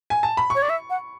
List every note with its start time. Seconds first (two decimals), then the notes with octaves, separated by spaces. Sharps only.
0.10 G#5
0.23 A5
0.37 B5
0.50 C#5 C#6
0.62 D5
0.70 E5
0.90 F#5